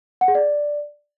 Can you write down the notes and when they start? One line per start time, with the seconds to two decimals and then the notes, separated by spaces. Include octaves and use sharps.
0.21 F#5
0.28 G#4
0.35 D5